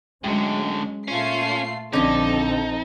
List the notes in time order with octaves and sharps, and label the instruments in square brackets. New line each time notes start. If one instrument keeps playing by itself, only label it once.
[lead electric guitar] A2 D3 [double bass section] F#3 G#3 C#4
[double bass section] A#2 [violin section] A3 F4 C7 [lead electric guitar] C#4
[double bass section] A#1 F3 C4 [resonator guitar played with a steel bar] D3 C#4 [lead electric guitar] D#4 [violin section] A4